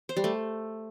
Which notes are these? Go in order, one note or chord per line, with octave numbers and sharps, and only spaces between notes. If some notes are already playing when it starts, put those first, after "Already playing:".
C5
G3
A3